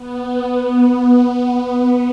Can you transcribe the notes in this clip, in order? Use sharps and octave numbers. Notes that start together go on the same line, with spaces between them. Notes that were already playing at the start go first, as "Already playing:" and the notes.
Already playing: B3